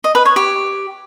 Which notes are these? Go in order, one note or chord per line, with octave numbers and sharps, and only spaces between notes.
D#5
B4
C#5
G4